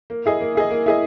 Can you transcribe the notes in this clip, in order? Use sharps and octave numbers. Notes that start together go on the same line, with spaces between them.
A#3
E4 G#4 D#5
A#3
E4 G#4 D#5
A#3
E4 G#4 D#5